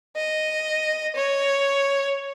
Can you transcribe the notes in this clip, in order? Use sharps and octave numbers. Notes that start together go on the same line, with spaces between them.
D#5
C#5